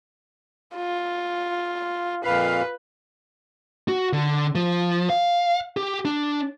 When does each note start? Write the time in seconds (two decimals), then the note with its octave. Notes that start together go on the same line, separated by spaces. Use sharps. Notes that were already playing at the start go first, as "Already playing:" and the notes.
0.75 F4
2.24 F2 A#2 B4 F5
3.88 F#4
4.13 D3
4.55 F3
5.10 F5
5.77 G4
6.05 D4